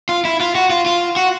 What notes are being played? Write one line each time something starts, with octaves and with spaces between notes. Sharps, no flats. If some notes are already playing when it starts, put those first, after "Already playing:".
F4
E4
F4
F#4
F4
F4
F#4